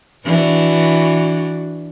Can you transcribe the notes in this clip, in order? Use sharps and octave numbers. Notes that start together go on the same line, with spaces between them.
E3 D4 F#4